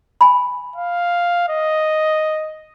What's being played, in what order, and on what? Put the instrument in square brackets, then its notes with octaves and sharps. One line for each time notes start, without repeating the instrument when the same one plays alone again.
[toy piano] G#5 B5
[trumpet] F5
D#5